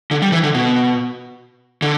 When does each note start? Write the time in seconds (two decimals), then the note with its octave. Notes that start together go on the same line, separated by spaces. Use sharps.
0.11 D3
0.22 G3
0.32 E3
0.43 D3
0.54 B2
1.82 D3